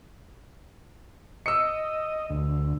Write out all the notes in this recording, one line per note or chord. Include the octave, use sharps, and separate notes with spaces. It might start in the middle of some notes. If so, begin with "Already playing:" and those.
D#5 E6 C#7
D2